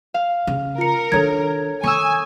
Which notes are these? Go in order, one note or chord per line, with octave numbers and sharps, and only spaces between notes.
F5
C#3
F4 A#4 C#7
D#3 D4 A4 C#5 G#6
D#3 G#5 C#6 D#6 E6